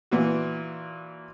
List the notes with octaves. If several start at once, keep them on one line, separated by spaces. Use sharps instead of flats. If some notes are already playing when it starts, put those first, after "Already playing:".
A#2 E3 F#4